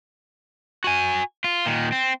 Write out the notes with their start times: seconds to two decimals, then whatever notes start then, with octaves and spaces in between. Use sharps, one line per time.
0.84 F#4 G#5
1.44 F4
1.66 A#2 D#3
1.92 C4